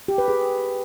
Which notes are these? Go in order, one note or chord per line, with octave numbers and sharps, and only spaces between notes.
G4
B4
G#4